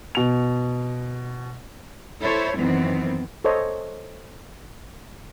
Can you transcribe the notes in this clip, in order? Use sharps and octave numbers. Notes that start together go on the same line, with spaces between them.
B2 F7
E4 A4 C5 C#5
F#2 D#3 E3 B3 C4
A4 C5 C#5 D#5